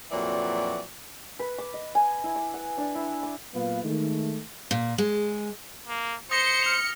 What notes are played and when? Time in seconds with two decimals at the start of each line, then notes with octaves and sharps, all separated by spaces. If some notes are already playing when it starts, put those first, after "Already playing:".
0.11 F2 A#2 E3 F#3 F#4 D5
1.39 B4
1.58 D6
1.74 D#5
1.95 G#5
2.24 E4
2.36 D6
2.54 F#5
2.78 D4
2.95 E4
3.23 D6
3.54 A#2 F#3 B3 B4 F5
3.84 D#3 G#3 A3
4.71 A#2
4.98 G#3
5.87 A#3
6.31 C5 D#6 A#6 C#7 G7
6.62 F6 F7